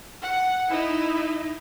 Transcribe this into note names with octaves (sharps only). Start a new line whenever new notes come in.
F#5
D#4 E4